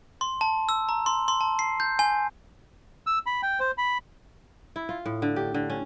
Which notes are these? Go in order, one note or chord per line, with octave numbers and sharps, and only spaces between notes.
C6
A5
E6
A#5
C6
C6
A5
C7
G6
G#5
E6
B5
G5
C5
B5
E4
F4
A2
D3
G4
D3
C#4